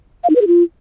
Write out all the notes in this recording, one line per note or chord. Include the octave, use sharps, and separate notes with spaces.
F5
D#4
B4
G#4
F4